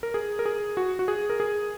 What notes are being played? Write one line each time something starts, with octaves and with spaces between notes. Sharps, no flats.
A#4
G#4
A#4
G#4
F#4
F#4
G#4
A#4
G#4